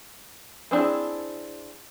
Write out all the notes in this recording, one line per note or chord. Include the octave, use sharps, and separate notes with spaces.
B3 C4 D4 E4 G#4